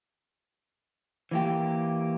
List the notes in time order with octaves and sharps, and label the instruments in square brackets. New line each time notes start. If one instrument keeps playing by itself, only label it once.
[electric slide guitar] E3 A#3 G4